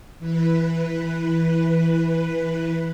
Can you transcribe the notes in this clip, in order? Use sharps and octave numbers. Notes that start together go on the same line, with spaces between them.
E3 B4